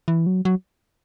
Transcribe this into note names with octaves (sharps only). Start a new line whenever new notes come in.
E3
F#3
F#3